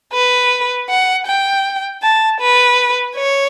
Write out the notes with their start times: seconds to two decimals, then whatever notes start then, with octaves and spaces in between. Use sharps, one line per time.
0.13 B4
0.89 F#5
1.27 G5
2.02 A5
2.40 B4
3.16 C#5